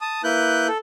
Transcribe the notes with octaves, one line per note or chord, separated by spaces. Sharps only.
A5 D#6
A#3 E4 B4 F#6 G6
A4